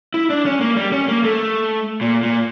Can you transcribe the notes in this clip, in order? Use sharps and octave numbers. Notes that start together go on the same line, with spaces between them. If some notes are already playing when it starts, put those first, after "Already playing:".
E4
D4
C#4
A#3
G3
C#4
A#3
A3
A#2
A#2